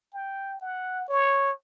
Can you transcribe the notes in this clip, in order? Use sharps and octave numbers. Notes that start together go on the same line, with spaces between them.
G5
F#5
C#5